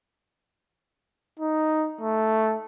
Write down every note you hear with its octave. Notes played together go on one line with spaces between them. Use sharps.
D#4
A3